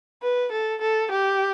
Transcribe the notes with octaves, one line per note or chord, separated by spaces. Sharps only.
B4
A4
A4
G4